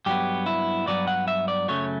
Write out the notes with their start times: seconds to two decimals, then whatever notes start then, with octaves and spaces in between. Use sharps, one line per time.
0.06 G2 F#3 B3 G4
0.46 E4
0.87 G2 F#3 B3 D5
1.08 F#5
1.28 E5
1.48 D5
1.68 F#2 C#3 F#3 A3 C#5